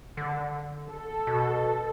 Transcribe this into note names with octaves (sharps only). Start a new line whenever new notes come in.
D3
A4
B2